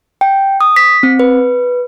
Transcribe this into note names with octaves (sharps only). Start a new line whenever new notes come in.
G5
D#6
B6
C4
B4